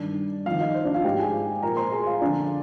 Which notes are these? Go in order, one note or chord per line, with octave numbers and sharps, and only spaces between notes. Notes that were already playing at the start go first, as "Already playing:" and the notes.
Already playing: G2 D#3 D4 D5
F2 D#3 F4 F5
D#4 D#5
C5
D4 D5
F4 F5
G#2 F3 G4 G5
G#4 G#5
A#2 F3 A#4 A#5
C5 C6
G#4 G#5
F4 F5
F2 D3 F3 D4 D5